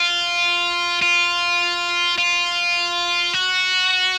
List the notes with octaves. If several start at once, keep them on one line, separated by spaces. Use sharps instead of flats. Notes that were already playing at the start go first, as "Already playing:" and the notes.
Already playing: F4
F4
F4
F#4